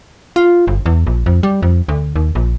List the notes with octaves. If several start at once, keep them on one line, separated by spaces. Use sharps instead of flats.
F4
G1
E2
A#1
F2
G3
F2
D2
D#2
A#1